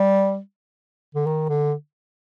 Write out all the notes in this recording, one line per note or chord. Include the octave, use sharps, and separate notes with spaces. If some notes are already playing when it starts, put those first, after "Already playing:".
Already playing: G3
D3
D#3
D3